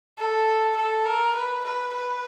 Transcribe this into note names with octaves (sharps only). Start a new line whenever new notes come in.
A4
A4
A#4
B4
B4
B4